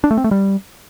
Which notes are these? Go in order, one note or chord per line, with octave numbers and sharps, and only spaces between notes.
D4
A3
C4
A3
G3